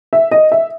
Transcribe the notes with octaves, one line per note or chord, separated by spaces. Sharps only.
E5
D#5
E5